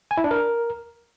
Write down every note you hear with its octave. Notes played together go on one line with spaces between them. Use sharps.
G#5
E4
D4
A#4